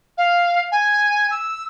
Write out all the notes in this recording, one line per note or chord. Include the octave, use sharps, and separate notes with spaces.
F5
G#5
E6